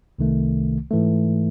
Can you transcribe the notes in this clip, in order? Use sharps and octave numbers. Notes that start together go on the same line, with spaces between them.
C2 C3 D#3 A3
G#2 E3 A3